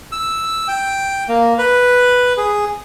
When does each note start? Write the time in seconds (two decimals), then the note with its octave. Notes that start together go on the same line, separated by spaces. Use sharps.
0.12 E6
0.68 G5
1.29 A#3
1.58 B4
2.37 G#4